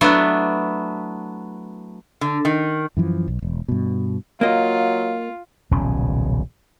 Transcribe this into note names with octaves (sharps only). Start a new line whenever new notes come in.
F#3 A3 B3 D4 E4
D3
D#3
F#2 E3 F3
B1
E1
G2 B2
F#3 A#3 F4 D#5
D#1 B1 C#3 C#4